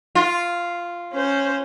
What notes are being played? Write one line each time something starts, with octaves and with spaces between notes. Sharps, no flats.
F4
C#4 C5